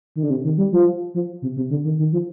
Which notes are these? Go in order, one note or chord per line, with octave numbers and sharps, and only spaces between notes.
D#3
D3
C3
D#3
G3
F3
F3
C3
C3
D3
D#3
D#3
F3